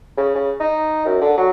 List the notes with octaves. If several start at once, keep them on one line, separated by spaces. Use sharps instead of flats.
C#3
C#3
D#4
F#2
D3
F#3